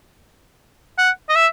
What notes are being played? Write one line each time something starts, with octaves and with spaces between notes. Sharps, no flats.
F#5
D#5
E5